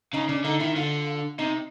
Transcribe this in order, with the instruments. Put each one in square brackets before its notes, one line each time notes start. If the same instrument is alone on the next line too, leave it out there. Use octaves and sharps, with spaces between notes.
[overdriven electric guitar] C#3 [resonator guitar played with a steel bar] D#4
[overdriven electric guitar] C#3 [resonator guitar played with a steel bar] D4
[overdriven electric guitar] D3 [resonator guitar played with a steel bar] D#4
[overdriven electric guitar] D#3 [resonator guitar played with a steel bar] E4
[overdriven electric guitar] D3 [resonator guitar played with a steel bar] F4
[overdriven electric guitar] C3 [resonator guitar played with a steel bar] D#4